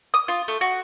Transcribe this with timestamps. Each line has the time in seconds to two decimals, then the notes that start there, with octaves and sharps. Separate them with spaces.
0.14 D#6
0.28 F4
0.48 A3
0.61 F#4